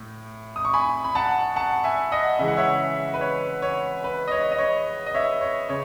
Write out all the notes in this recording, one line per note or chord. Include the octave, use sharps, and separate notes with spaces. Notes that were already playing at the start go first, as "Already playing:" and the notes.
Already playing: A2
D#6
C#6
G#5 B5
B5
F#5 A5
F#5 A5
E5 G#5
D#5 F#5
C#3 E3 G#3 E5
F#5
C#5 E5
B4
C#5
C#5
B4
D#5
C#5
D#5
C#5
D#5
C#5 E5
C#5
C#3 C#5